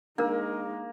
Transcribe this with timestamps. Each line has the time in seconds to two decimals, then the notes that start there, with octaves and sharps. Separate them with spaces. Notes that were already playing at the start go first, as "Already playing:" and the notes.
0.18 G#3 A#3 D4 D#4 A#4